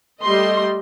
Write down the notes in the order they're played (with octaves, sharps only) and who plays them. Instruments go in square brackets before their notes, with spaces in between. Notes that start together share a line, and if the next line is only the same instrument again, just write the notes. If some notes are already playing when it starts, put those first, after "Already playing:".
[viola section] G3 A3 D#5 C6